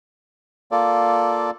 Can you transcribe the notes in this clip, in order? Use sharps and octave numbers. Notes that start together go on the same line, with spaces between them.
A#3 F4 A4 D5